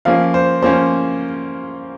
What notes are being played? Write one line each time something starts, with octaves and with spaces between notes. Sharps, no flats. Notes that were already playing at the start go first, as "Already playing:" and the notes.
F3 A#3 C#4 F5
C5
F3 A#3 C#4 C5